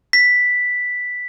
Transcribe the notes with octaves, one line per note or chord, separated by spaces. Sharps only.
B6